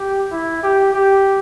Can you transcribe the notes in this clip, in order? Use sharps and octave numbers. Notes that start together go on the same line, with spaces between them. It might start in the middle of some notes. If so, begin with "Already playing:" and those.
Already playing: G4
E4
G4
G4